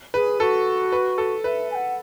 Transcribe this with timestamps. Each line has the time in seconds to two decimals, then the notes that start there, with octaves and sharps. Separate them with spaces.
0.14 G#4 B4
0.40 F#4 A4
0.92 B4
1.18 A4
1.44 B4 E5
1.71 G#5
1.74 F#5